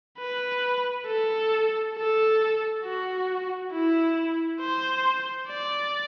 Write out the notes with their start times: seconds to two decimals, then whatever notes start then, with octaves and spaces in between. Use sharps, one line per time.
0.19 B4
1.06 A4
1.95 A4
2.84 F#4
3.72 E4
4.60 C5
5.48 D5